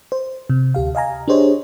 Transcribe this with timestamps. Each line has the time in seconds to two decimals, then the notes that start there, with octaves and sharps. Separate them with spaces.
0.12 C5
0.50 C3
0.75 D2 G4 F5
0.95 D#5 F5 G#5 A#5
1.28 D4 G4 G#4 C5 C#5 D#5